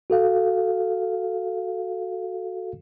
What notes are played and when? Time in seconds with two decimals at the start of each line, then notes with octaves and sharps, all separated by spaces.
0.10 F#4 A4 F5